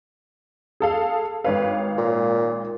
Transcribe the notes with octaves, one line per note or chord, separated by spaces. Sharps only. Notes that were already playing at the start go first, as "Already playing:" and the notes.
G#4 A4 F5
G#1 B4 C#5 F5
A#2